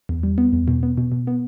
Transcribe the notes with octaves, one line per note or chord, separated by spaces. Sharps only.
E2
G3
B3
E2
B2
B3
B2
B2
B3